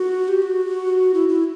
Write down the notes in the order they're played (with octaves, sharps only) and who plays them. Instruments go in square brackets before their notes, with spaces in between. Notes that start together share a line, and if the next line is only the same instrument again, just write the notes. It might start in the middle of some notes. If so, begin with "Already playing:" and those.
Already playing: [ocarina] F#4
G4
F#4
E4
E4